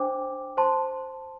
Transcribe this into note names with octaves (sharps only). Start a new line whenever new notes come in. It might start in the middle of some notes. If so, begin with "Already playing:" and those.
Already playing: D4 C5 G5 D6
C5 A5 C6